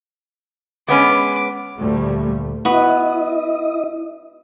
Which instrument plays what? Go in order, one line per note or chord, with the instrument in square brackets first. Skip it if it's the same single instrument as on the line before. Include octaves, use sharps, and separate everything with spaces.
[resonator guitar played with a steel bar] G#3 B3 C#4 [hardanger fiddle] D6
[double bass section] D2 A#2 G3 A3
[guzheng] B3 F#4 [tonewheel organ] E4 D#5